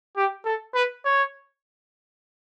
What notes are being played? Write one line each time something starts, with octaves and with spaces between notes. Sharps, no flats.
G4
A4
B4
C#5